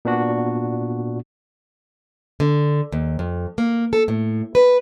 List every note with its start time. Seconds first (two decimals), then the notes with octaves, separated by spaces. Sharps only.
0.05 A#2 B3 D4 F#4
2.40 D3
2.92 D#2
3.19 F2
3.58 A#3
3.93 A4
4.08 A2
4.55 B4